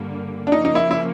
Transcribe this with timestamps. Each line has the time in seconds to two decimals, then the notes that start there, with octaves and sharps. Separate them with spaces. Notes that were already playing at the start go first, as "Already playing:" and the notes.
Already playing: G2 D3 G3 A#3
0.47 D4
0.52 C#3 F3 A#3 D#4
0.65 D#4
0.75 E4
0.91 E4